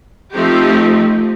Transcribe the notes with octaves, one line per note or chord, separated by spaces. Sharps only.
F3 A3 C4 D#4 G4